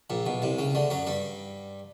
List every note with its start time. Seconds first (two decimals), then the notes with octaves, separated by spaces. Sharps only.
0.10 A#1 A#2
0.26 B1 B2
0.42 C2 C3
0.59 C#2 C#3
0.75 D2 D3
0.90 F#2 F#3
1.07 G2 G3